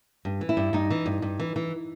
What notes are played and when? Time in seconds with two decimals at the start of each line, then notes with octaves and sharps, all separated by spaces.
0.25 G2
0.41 E3
0.49 E4
0.57 G2
0.73 G2 D#4
0.90 E3
1.06 G2
1.22 G2
1.40 E3
1.56 E3